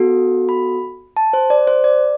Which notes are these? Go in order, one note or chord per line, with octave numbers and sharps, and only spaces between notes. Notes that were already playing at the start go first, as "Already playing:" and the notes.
Already playing: B3 F#4 A4
B5
A5
C5
D5
C5
D5